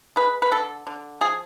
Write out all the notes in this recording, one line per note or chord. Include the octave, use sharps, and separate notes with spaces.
G#3 B4
B4
D3 A4
D3
F3 G#4